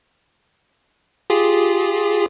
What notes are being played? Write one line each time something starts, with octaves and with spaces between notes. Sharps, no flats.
F4 G4 G#4